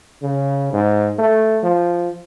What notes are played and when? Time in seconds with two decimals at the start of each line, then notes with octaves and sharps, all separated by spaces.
0.22 C#3
0.73 G#2
1.18 A3
1.63 F3